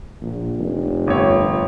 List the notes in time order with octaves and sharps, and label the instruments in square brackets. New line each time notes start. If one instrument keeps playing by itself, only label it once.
[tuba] A#1
F1
[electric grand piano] G1 C#5